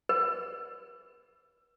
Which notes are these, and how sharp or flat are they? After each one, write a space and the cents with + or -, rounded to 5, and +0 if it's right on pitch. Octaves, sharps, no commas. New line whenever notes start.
B4 -40